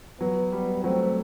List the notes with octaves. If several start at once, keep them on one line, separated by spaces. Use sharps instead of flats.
F#3 B3
G3
F#3 A3 C4